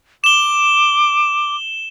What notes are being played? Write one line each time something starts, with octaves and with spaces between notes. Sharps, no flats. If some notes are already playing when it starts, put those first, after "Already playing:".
D6 E7 G7